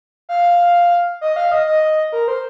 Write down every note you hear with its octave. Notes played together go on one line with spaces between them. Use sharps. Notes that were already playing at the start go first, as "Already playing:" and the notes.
F5
D#5
F5
D#5
D#5
A#4
C5